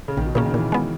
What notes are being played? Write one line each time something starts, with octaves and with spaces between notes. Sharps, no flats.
C#3
A#1 D#3
B2
A#2 C#3 A#3 C#4
D#3
A#2 E3
G#3 B3